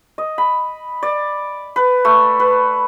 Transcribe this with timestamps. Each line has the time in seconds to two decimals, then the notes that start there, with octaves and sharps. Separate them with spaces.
0.18 D#5
0.38 B5
1.03 D5
1.76 B4
2.05 A3
2.40 B4